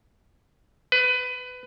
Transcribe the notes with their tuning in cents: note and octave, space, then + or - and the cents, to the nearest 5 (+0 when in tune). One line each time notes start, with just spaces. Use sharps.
B4 +20